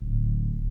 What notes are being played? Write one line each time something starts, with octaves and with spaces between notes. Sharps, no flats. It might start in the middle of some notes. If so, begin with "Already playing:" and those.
D1